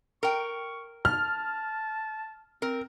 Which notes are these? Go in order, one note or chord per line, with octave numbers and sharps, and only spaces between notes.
A#4 G5 C#6
A5 F6
C4 A#4